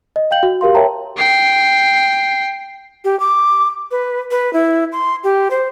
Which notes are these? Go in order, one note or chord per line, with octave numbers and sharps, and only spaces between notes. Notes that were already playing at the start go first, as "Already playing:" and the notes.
D#5
F5 G5 G6 F#7
F#4
G4 A#4 F5 C6
A#4 C#5 E5 G5 A5 A#5
G5 C7
G4
D6
B4
B4
E4
C6
G4
C5